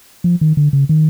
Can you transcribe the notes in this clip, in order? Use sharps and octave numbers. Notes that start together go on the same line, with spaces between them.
F3
D#3
D3
C#3
D#3